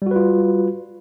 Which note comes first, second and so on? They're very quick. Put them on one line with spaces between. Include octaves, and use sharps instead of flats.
G3 F#4 B4 F4